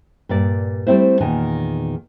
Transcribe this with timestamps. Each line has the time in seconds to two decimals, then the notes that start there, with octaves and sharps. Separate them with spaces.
0.29 G2 A#2 D5
0.87 G3 A3 C4 E4 C5
1.21 E2 A#2 D#3 G#5